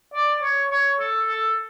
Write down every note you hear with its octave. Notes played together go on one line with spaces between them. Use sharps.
D5
C#5
C#5
A4
A4